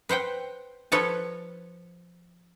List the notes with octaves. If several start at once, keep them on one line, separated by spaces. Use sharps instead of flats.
B4 C5 F#5 G5
F3 A4 B4 C#5 A5